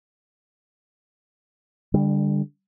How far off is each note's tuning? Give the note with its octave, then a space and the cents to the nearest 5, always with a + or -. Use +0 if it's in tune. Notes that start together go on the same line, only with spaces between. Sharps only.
D3 +0 G3 +25